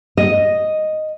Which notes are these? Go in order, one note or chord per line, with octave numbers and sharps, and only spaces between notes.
D#5